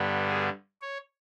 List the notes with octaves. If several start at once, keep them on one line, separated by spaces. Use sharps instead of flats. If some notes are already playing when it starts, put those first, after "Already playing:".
Already playing: G2 D3 G3 B3
G#4
C#5